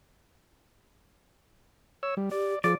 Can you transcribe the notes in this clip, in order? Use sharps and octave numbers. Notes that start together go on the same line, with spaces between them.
C#5 E6
G3
G4 D5
F3 G#4 D5